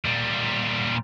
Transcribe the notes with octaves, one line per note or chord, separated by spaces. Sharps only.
A#2 G3